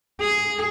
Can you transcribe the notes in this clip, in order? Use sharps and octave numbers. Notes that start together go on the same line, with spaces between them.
G#4